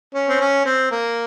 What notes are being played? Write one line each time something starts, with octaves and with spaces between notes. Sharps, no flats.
C#4
C4
C#4
C4
A#3